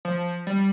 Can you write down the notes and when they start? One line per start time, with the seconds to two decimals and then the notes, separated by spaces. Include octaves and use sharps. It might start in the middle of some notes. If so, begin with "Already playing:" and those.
0.05 F3
0.47 G3